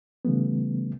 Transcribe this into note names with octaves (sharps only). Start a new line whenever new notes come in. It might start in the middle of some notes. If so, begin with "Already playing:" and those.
C#3 E3 G3 A3 B3